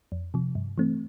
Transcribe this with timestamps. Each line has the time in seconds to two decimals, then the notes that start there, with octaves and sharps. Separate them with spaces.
0.12 F2
0.34 C3 F3
0.55 G2
0.78 E3 A3 C4